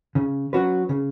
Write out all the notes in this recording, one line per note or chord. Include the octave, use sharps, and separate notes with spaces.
C#3
F#3 C#4 F#4 B4
C#3